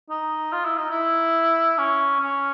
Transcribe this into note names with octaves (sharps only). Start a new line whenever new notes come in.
D#4
F4
E4
D#4
E4
C#4
C#4